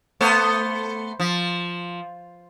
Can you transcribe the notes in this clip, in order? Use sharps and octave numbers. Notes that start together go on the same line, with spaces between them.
A3 B3 C5
F3